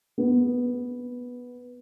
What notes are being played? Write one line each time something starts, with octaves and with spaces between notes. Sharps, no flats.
B3